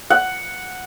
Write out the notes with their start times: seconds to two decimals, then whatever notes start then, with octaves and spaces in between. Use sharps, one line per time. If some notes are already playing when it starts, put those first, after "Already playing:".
0.10 F#5